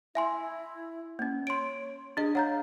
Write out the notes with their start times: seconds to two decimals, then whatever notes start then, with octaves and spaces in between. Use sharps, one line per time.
0.15 E4 E5 G#5 C6
1.19 A#3 C#4
1.47 C#5 C6 D7
2.17 D4 G#4 D#5
2.35 C#5 F5 F#5 A#5 G6